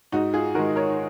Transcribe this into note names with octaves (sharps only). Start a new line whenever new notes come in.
G#2 D#4 F#4
F4 G#4
D#3 G#3 F#4 A#4
A#4 C#5